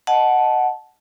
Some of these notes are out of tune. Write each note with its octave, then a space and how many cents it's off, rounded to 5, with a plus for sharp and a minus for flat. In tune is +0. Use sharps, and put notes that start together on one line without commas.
D#5 -5 F#5 +0 A5 -15